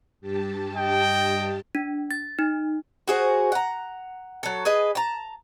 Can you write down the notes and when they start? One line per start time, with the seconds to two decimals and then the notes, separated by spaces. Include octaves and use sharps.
0.21 G2 G4 A5
0.76 D#5 G5
1.75 D4
2.11 A6
2.39 D#4
3.08 F#4 G#4 C5
3.52 F#5 A#5
4.43 F#3 A4
4.65 G#4 B4 D#5
4.95 A5 A#5